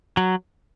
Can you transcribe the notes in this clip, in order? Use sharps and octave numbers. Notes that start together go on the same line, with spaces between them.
F#3